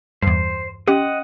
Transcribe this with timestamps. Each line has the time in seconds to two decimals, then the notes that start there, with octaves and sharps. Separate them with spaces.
0.22 E2 G2 C5
0.88 C#4 G4 D#5 F#5 C6